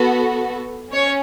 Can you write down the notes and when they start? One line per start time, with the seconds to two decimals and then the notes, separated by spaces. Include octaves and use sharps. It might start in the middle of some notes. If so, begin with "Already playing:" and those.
Already playing: B3 F#4 A4
0.93 C#4 C#5